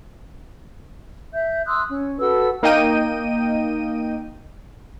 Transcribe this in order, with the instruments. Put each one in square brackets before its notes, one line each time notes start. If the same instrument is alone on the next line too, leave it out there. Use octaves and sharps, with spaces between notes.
[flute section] E5 G6
C6 D#6 E6 F#6
C#4
F#4 A4 B4 E6
[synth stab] A#3 D#4 D#5 G5 D#7